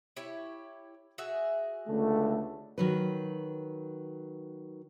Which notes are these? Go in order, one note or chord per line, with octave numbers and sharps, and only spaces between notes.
E4 G4 C#5
F#4 G#4 E5
C#2 D3 A3
D#3 F#3 B4